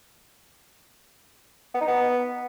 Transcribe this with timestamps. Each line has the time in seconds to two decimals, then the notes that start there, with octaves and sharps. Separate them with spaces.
1.74 B3
1.81 D#4
1.87 B3